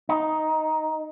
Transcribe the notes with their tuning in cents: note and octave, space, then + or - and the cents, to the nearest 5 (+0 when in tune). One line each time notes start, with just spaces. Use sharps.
D#4 +5